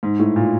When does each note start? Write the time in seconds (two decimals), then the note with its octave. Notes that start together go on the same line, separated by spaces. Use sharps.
0.03 G#2
0.19 A2
0.36 A#2